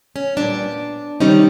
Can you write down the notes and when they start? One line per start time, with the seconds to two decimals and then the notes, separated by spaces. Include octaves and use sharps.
0.16 C#4
0.36 A#2 G3 B3 D4
1.20 C3 D#3 G3 C4 C#4 D#4